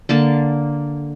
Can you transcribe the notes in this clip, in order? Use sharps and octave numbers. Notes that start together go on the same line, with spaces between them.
D3 A#3 A5